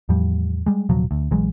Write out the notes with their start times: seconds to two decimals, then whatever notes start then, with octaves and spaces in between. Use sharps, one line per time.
0.09 E2 A2 F3 G3
0.66 G3 G#3
0.89 D#1 C3 F3 F#3
1.11 D2
1.31 A#1 E3 F#3 G#3